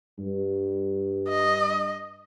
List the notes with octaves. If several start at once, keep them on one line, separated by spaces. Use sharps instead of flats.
G2
D#5